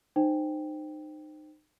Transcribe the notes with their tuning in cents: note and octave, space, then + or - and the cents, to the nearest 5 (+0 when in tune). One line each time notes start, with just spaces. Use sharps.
D#4 -30 C5 +0 G5 +0